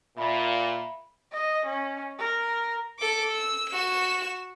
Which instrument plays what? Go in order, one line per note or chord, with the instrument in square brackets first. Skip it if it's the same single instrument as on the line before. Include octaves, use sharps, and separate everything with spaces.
[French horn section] A#2 [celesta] E5 B5
[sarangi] D#5
C#4
A#4
[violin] A4 D6
E6
F#4 E7